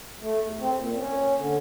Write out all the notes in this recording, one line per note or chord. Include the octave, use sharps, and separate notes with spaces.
A3
E2
C4
A#2
C#4
D3